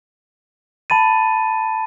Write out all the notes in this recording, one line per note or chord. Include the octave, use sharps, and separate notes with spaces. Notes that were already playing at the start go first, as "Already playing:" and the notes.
A5 B5 A6 D#7